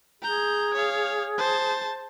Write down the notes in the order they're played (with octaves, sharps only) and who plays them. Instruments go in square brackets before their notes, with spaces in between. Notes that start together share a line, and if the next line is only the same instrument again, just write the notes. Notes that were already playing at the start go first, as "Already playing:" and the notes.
[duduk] G#4 [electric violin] A#5 G6
[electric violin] C#5 F5
C5 A5